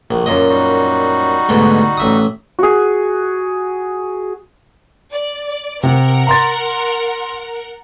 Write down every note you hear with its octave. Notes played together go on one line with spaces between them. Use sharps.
A#1 B2 A3
F#2 A#2 D#5
G3 D#4 F#4
D2 G#2 B2
A1 E5 D#6
F#4 G#4
D5
C3 A#4 F#5
A#5 C6 A6